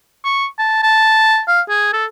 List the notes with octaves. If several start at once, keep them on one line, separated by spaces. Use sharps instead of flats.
C#6
A5
A5
F5
G#4
A4